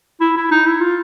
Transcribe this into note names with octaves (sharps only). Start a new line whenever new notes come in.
E4
E4
D#4
E4
F4